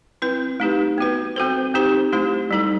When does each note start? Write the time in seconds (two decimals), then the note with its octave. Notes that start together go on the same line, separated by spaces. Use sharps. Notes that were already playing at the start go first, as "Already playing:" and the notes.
0.22 C4 E4 B4
0.60 A3 D#4 G4 B4
0.98 B3 F#4 B4
1.36 C4 F#4 A4 C5
1.74 C4 D#4 G4 C5
2.13 A3 E4 G4 C5
2.51 G3 D#4 A4